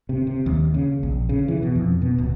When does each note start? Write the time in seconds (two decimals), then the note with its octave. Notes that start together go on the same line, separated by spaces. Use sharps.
0.09 C3
0.27 C3
0.46 D#2
0.74 C#3
1.03 A#1
1.29 C#3
1.48 E3
1.62 B2
1.75 F2
2.02 B2
2.18 D1